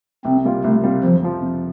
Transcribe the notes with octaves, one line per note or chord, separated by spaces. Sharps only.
C2 C4
C3 G3 A#3 F4
C2 A3
C3 G3 A#3 F4
F2 F3
C3 F3
F2